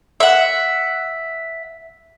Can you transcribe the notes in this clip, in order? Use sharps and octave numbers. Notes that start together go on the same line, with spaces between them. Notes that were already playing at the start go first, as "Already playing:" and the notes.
E5 F#5